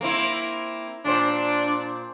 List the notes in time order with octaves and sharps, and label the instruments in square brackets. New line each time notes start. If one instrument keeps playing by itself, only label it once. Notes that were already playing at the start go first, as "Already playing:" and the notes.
[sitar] A#3 C4 E4
[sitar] A#2 C5 [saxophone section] D4